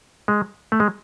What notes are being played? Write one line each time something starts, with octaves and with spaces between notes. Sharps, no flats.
G#3
A3
G#3